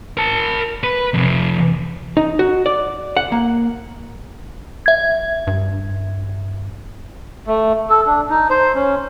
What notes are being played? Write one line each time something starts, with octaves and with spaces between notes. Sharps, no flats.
A#4 A5
B4
F2 C3
D#4
F#4
D5
F#5
A#3
E5 G#6
G2
A3
A4
D4
D#4
C5
C#4